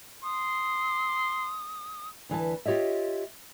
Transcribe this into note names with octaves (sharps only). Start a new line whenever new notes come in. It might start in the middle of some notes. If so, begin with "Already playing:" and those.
C6 D#6
D2 E3 B4 A5
F4 G4 C#5 D#5 E5